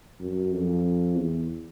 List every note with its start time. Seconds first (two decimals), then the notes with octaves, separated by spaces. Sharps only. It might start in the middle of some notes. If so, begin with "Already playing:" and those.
0.20 F#2
0.52 F2
1.15 E2